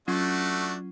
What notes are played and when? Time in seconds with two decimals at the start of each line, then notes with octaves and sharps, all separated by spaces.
0.08 F#3 A3 C#4 D4 F4 F#4